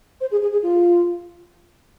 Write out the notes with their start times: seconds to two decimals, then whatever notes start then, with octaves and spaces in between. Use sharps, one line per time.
0.21 C5
0.31 G#4
0.42 G#4
0.52 G#4
0.63 F4